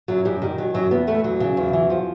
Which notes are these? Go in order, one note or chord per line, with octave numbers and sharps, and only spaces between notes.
F#2 F#3
F#2 G3
D#3 G3
D#3 F#3
F#2 F#3
E2 B3
E3 A3
E2 F#3
C#3
E2
E3
F3